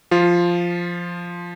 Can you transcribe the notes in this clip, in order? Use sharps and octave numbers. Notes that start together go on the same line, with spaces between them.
F3 F4